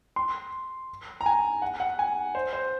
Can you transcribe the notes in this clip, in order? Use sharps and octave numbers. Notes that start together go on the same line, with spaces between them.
C6
A#5
G#5
F#5
F#5
G#5
C5
C5